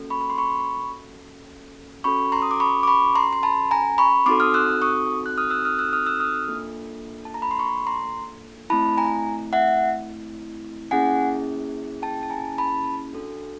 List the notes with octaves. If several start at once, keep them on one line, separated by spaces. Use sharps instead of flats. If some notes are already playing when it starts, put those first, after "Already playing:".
Already playing: A#3 C#4 F#4 A4
B5 C#6
B5
C6
B5 C#6
C#4 F#4 A4 B5 C#6
A#5 C6
D#6
D6
B5 C#6
D6
B5 C#6
A#5 C6
C6
A5 B5
G#5 A#5
B5 C#6
C4 D#4 F#4 A4 C6 D6
D#6 F6
E6 F#6
C#6 D#6
F#6
D#6 F6
E6 F#6
D#6 F6
E6 F#6
D#6 F6
E6 F#6
D#6 F6
A#3 D4 F4 A4
A5
A#5
B5
C6
B5 C#6
A#5 C6
A3 C4 E4 A5 B5
G#5 A#5
E5 F#5
A#3 C#4 E4 G#4 F#5 G#5
G5 A5
A5
G#5 A#5
A5 B5
D4 F#4 A4